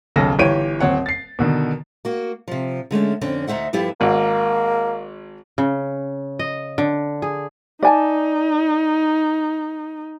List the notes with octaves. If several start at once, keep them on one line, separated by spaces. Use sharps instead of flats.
D#1 B1 C#3 A4 A#6
G1 E3 G4 C#5 D7 D#7
D#1 C4 C#5 F#5
A6 C7
B2 D3 D#3
A#3 F#4
C3 F3
D3 G#3 A3 C#4
F2 D3 C4 C#4
D2 D#4 C5 E5 F#5
G2 F3 B3 E4 G4 A4
G#1 A#3
C#3
D#5
D3
G#4
D#4 D5 G#5 A5